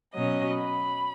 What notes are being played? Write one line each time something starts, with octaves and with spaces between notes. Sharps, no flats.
B2 F#3 C#4 D#5
B5